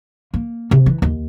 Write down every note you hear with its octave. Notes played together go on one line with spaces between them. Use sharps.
A#3
C3
E3
D#2